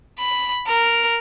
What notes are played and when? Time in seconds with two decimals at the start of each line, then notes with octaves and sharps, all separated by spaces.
0.19 B5
0.68 A#4